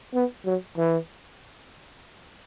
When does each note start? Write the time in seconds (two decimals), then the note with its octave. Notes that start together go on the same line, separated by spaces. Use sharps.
0.14 B3
0.46 F#3
0.78 E3